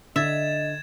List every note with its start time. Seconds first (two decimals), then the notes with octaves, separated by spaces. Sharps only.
0.16 D3 D#5 E5 G#6 A6 E7